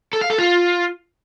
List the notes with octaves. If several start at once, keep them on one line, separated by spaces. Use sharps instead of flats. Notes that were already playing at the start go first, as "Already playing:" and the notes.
A4
F5
A4
F4